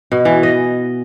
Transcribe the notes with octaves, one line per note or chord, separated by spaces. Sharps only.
B2
E3
D#5